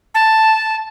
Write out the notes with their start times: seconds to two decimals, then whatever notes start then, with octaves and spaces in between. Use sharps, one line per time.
0.15 A5